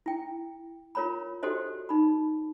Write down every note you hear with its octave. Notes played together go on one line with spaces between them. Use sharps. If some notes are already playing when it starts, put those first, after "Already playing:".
E4 G5
F4 A#4 C#5 A#5 B5
F#4 G4 A4 C5 D#5
D#4 B5